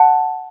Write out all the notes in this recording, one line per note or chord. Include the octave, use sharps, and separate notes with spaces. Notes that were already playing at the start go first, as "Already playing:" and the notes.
Already playing: F#5 A5